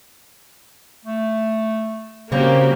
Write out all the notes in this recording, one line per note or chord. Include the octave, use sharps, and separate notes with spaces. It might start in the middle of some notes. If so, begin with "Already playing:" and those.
A3
C#3 G3 A#3 C4 F#4 G4 C5